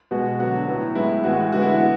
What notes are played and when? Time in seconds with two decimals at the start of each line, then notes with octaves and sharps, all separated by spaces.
0.11 B2 G#3 B3 F#4
0.39 D3 F#3 B3 F#4
0.67 A2 F#3 B3
0.95 A2 G#3 B3 E4
1.24 A2 E3 G#3 B3 F#4
1.52 D3 G#3 B3 F#4
1.62 E4
1.71 F#4
1.80 B3